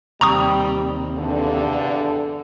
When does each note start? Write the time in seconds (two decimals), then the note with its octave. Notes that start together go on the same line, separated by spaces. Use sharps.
0.21 D#2 C3 G3 A#5 C#6 D#6
1.17 E2 G2 D3